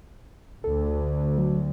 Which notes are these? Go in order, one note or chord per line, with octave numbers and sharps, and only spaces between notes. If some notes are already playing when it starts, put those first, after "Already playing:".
D2 A4
F#3